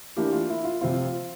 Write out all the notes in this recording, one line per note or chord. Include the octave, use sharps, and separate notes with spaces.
E3 A#3 D4 G4
F4
E4
F4
C3 F3 C4 F4